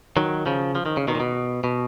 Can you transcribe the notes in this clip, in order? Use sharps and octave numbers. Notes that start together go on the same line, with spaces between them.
D#3 F#3
C#3 F3
F3
D#3
C#3
B2 D#3
A#2
B2
B2